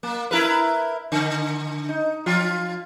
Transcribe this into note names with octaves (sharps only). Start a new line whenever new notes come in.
A#3
E4 A#4 B4
D3
D#4
F3 F4